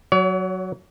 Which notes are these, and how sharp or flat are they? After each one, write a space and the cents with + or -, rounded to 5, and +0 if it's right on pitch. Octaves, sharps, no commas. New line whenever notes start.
F#3 +0 C#5 +40